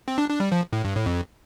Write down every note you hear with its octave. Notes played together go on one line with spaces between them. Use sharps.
C4
D4
D4
G3
F3
A2
G2
A2
F2